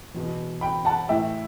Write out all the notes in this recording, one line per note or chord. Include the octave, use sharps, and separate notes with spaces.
E2 B2
G5 B5
F#5 A5
A2 E3 E5 G5